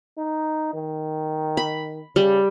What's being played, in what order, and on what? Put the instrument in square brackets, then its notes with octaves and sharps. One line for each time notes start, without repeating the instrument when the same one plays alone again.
[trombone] D#4
D#3
[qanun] B5
[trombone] C#3 [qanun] G3